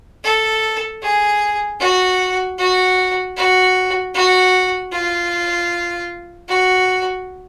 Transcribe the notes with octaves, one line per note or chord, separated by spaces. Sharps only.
A4
G#4
F#4
F#4
F#4
F#4
F4
F#4